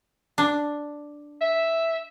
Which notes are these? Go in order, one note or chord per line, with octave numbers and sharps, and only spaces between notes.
D4
E5